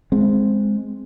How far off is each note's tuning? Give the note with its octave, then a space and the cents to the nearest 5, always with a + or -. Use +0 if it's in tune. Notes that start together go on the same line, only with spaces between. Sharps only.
G#3 +0 C4 +0